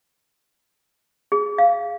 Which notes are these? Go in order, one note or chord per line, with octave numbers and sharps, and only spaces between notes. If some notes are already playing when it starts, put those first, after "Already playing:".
G#4
F5